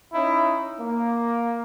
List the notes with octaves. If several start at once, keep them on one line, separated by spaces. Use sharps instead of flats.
C#4 D#4 E4
A#3